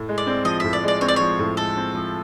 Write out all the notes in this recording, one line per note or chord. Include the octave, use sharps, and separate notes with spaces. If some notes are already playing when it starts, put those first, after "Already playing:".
Already playing: A2
G#3
D5
C4
F3 D#5
A2 E5
D5
G#3 D5
C4 C#5
D5
F3 C#5
A2
G#3 A4
C4
F3